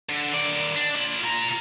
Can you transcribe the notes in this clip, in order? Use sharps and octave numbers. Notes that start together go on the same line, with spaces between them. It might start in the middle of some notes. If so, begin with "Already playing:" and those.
D3
D#3 D5
D4
F4 B5
F4 A#5